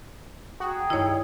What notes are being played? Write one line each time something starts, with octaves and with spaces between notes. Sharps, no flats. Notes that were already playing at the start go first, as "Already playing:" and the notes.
F#4 G#4 G5 A#5 D#6
G2 D#3 E4 C#5